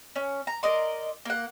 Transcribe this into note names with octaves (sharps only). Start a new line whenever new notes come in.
C#4
A#5
A#4 D5 D#5 C6
A#3 F#5